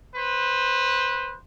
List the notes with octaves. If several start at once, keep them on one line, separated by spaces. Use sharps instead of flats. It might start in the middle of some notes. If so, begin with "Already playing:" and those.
B4 C5